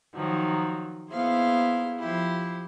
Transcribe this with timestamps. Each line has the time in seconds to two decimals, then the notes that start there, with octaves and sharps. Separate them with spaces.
0.13 D#3 F3 F#3
1.10 A#3 B3 E4 G#4 C5 F5
1.99 F3 E4 G4